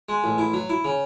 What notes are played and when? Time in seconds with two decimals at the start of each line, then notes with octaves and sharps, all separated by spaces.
0.09 G#3
0.24 A1
0.38 E4
0.54 F#3
0.69 E4
0.84 C#3